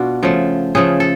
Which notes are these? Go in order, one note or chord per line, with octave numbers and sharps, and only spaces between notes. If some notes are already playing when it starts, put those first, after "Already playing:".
Already playing: B2 D4 F4 F#4
C#3 F3 A3
C#3 F3 A3 G#4
A4